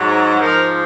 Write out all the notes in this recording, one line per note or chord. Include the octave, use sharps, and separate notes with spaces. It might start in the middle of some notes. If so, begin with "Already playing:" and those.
Already playing: G#2 F#3
G#2 F3 A#4